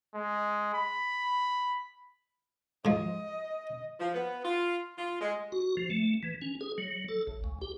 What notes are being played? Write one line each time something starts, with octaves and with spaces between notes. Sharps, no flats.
G#3
B5
G#2 F3 D#5
F3
B3
F4
F4
G#3
F#4
F3
A3
E3
C#4
G#4
F#3
A4
A1
C#2
G4